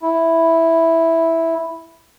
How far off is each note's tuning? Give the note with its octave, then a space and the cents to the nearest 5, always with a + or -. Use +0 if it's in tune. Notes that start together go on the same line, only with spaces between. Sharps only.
E4 -5